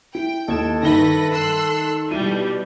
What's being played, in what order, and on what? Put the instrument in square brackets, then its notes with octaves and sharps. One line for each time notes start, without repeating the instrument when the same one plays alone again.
[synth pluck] E4 [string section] G5
[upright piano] D#2 [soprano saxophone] A4 [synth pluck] D#5 G#6 E7
[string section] G2 B4 A#6 [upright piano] D#3 G7 [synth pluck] D#4 E5
[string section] C6 E6 F#6
[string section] B2 G3 [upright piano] E4 D#7